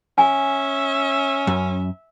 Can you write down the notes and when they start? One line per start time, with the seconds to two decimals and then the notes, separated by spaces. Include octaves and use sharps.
0.18 C#4 E5 G#5
1.47 F#2